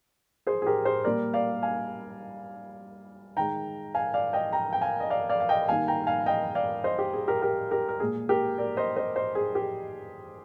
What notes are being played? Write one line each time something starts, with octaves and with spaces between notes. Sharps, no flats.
G#4 C5
G#4
G4 A#4
G#4 C5
A#2 G3 A#3 A#4 D5
D5 F5
F5 G#5
D#3 G#3 G5 A#5
F5 G#5
D5 F5
D#5 G5
G5 A#5
G5
F5 G#5
D#5
D5 F5
D5 F5
F5
D#5 G5
D#3 G3 A#3 F5 G#5
G5 A#5
F5 G#5
D#5 G5
D5 F5
C5 D#5
G4
G#4
G4 A#4
G4 A#4
G4 A#4
A#4
A#2 G#3 G#4
G4 A#4
A#4 D5
C5 D#5
C5 D#5
C5 D#5
G#4
G4